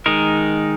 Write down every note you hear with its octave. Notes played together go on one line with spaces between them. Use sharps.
D#3 G#3 D#4 A#4